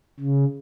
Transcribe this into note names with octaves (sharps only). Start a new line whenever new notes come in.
C#3